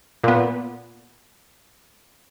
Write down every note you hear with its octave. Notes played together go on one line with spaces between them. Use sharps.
A#2 B3